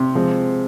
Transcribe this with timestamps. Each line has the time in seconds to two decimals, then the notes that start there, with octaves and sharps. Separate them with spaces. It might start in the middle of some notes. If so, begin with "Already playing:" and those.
Already playing: C3
0.15 F3 G#3 C4